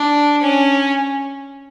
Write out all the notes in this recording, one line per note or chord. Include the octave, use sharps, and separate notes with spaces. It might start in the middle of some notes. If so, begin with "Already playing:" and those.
Already playing: D4
C#4